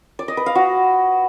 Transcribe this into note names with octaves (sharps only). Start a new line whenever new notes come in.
D5
D#5
B4
F5
F#4